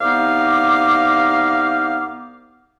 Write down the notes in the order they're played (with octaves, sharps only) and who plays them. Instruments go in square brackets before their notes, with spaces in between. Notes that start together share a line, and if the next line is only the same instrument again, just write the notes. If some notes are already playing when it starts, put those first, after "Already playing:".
[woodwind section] C2 B3 D#4 F5 D6